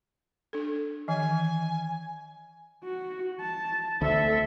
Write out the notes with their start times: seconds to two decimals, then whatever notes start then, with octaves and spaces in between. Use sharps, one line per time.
0.53 D4 A4
1.08 D#3 E3 G#5
2.85 F#4
3.41 A5
4.01 D2 A4 E5